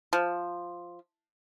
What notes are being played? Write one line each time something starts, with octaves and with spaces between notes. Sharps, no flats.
F3